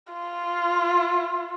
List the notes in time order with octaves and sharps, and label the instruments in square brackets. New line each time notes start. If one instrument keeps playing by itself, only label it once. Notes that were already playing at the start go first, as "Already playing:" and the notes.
[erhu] F4